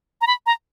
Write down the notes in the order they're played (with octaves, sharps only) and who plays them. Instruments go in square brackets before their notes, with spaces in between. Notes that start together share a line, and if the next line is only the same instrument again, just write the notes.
[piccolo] A#5
B5
A#5